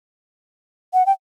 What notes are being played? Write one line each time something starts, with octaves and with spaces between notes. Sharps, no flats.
F#5
G5